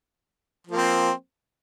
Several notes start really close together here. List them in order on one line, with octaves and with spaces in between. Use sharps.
F3 A#3 C4